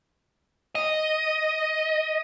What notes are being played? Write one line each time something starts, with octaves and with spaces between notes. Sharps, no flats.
D#5